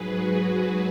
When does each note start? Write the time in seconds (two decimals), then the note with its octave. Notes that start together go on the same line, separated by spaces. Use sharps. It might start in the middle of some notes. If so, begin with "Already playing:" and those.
Already playing: G#2 F#3 G#4 B4
0.12 F#4